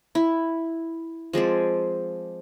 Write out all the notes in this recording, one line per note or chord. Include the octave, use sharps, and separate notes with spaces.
E4
F3 G#3 C4 D5